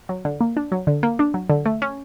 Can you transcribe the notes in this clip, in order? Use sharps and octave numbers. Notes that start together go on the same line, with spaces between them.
F#3
D3
A#3
D4
F#3
D3
A#3
D4
F#3
D3
A3
C#4